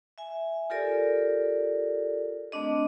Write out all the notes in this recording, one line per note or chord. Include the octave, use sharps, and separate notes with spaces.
E5 G#5
F4 G4 A4 A#4 D5
A3 C4 D4 D#5